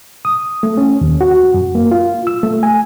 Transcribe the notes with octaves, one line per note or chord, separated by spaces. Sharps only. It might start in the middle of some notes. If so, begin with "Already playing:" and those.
D#6
A3
C#4
D#2
F#4
F#2
A#3
F4
E6
A3
G#5